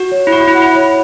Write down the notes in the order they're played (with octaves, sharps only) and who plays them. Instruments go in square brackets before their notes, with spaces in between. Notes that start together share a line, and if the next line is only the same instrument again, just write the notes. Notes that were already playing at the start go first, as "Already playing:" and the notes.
Already playing: [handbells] F#4
[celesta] C#5
[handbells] E4
[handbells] F#4 [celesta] B5
[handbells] E4
[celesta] F#5
[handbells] E4
[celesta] C#5